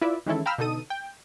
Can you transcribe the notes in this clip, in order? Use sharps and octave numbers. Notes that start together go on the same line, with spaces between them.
E4 F4 B4 D5 E5
D#3 E3 G#3 C#4 E4 A4
F5 G5 A#5 B5 E6 F6
B2 D3 D#4 A4 D#6 D#7
G5